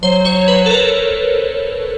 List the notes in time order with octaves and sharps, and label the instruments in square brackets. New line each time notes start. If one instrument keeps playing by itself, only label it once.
[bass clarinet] F#3 [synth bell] C5
[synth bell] C#5
B4
A4
A#4